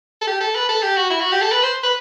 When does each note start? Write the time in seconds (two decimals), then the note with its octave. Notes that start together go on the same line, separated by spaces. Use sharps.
0.21 A4
0.27 G4
0.40 A4
0.55 B4
0.69 A4
0.83 G4
0.96 F#4
1.10 E4
1.20 F#4
1.32 G4
1.42 A4
1.52 B4
1.63 C5
1.83 B4